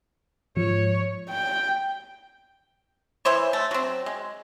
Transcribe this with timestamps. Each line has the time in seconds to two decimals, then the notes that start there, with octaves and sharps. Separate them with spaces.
0.57 G#2 F3 C#5
1.30 G5
3.25 E3 E4 C5 C#5
3.53 A3
3.71 F#3 C4
4.06 G#3